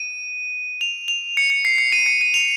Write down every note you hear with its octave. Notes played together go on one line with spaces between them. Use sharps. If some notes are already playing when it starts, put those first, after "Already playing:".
Already playing: D#7
F7
F7
C#7
C#7
C7
C#7
D#7
C#7
D#7
F7